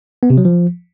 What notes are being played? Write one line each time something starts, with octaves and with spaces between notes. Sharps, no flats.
B3
C3
F#3
F3